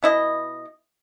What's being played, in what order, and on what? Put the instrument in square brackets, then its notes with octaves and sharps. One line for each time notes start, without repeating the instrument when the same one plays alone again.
[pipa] B2 E4 D#5